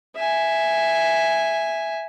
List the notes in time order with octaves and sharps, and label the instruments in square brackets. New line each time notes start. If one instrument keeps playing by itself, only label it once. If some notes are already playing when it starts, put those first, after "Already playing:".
[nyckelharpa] E5 G#5